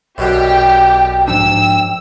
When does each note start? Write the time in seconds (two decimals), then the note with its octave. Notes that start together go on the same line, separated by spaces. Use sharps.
0.18 B1 F#2 B2 D3 G4 G5
1.28 G#2 F3 D4 G5 E6